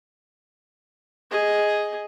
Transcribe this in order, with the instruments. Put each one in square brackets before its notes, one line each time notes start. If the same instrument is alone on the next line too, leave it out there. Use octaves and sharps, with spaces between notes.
[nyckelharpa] G#4 D#5